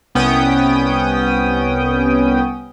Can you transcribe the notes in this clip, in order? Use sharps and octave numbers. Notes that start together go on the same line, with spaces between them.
C2 B3 C#4 G5 D#6